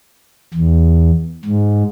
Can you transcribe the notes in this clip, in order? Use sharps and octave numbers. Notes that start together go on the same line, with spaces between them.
E2
G#2